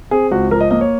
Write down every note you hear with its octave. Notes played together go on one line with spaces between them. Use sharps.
C4 G#4
C#2 F#4
F3 A#4
D#5
A#3 D#5
C#5